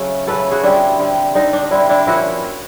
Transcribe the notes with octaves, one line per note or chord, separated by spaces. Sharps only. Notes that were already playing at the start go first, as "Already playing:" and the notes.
Already playing: C#3 F#3 A3 C#4
C#3 F#3 A3 C#4 A4 B4
F#4 G#4
D3 G3 C4 D4 E4
D3 G3 C4
D3 G3 C4 D#4
D4
D3 G3 C4 D4 E4
D4 E4
F3 A#3 C#4 E4 F#4